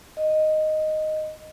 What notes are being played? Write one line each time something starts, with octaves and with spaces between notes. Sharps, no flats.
D#5